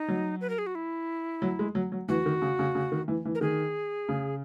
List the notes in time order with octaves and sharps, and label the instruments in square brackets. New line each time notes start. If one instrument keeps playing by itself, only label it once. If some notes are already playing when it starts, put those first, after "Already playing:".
Already playing: [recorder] D#4
[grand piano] F#3
[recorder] B4
A#4
G#4
F#4
E4
[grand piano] F#3
G#3
F#3
F#3
[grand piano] E3 [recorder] F#4
[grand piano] D#3
C#3
C#3
C#3
D#3
E3
E3
[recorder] A#4
[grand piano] D#3 [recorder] G#4
[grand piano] C#3